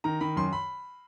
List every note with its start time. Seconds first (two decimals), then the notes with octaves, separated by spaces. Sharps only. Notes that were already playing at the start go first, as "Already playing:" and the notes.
0.04 D#3 A#5
0.21 D#3 B5
0.36 F#2 C6
0.53 B5